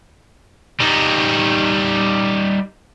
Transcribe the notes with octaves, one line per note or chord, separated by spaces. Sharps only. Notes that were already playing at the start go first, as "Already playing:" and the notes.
G3 D#4